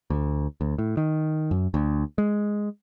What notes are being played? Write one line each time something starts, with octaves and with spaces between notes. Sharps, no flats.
D2
D2
A2
D#3
F#2
D2
G#3